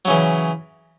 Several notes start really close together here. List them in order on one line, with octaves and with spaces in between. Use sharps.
F#3 C#3 E3